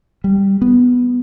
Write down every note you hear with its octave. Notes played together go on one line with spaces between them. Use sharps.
G3
B3